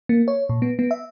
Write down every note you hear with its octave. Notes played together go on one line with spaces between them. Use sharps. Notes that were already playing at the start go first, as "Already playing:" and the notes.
A#3
C#5
A#2
B3
B3
E5